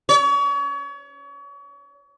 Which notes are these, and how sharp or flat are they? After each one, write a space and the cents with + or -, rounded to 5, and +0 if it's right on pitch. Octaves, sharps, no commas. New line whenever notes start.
C#5 +35